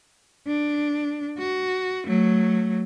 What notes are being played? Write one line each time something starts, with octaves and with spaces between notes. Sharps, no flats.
D4
F#4
F#3 A3